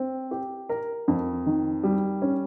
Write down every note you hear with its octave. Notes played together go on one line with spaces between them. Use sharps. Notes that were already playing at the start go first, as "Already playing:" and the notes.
Already playing: C4
G4
A#4
F2
D#3
G3
C#4